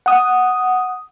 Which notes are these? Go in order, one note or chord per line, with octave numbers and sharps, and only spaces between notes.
F#5 D#6